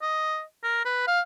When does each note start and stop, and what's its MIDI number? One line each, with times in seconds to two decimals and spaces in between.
0.02 0.42 75
0.64 0.84 70
0.85 1.07 71
1.07 1.21 77